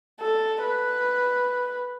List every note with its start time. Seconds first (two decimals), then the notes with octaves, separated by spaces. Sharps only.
0.20 A4
0.62 B4